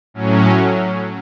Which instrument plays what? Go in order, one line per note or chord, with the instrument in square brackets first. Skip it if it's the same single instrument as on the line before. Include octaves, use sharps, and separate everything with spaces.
[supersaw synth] A2 F#3 C#4